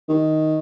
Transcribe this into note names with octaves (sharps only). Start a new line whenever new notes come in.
D#3